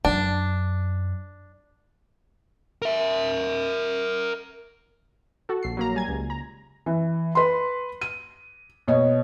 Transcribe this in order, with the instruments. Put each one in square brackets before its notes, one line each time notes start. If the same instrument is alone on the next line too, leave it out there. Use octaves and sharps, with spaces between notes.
[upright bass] F#2 [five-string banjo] D4
[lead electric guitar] A#4 E5
[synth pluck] F#4 A4
A#1 C7
F#3 A#3 A#5
G3 G#5 G#6
C#2
A#5
[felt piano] E3
B4 C6
D#7
B2 C#5 D#5